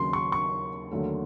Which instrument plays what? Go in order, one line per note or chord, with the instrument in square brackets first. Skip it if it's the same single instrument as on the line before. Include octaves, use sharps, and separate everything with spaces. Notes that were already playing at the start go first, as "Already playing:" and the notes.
Already playing: [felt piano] D#2 C#3 F#3 [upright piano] C6
[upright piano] C#6
C#6
[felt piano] D#2 D3 F#3 A3